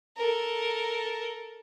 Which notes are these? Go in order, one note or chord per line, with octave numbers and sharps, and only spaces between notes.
A4 A#4